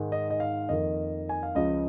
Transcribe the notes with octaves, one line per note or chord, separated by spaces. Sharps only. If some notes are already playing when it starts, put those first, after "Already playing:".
Already playing: G#2 D#3 G#3
D#5
D#5
F5
F2 D#3 A#3 D#5
G#5
F5
C#2 C#3 F3 D#5